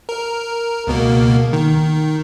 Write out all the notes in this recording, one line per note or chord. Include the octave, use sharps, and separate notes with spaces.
A#4
C#2 B2 A#3
D#3